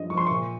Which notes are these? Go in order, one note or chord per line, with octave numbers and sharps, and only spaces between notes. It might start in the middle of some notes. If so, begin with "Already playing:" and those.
Already playing: G2 F3 D#5
F3 C#6
C6
A#2 C#6